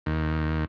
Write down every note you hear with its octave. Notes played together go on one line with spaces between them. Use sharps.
D#2